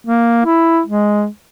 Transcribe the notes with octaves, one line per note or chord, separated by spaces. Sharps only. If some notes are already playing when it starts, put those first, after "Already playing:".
A#3
E4
G#3